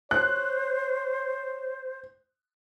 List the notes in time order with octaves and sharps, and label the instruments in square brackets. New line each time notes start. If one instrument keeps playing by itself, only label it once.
[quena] C5 [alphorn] C#5 [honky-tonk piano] F#6